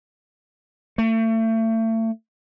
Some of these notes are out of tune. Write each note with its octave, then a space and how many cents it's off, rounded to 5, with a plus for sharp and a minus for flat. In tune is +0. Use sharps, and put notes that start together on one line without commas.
A3 +35